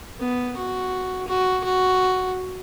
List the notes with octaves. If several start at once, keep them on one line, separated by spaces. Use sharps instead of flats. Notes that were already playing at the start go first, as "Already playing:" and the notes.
B3
F#4
F#4
F#4